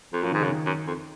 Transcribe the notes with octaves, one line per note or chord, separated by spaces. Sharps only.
F2
F#2 F3
G#2 D#3
F#2 C#3
D#3
F#2
F2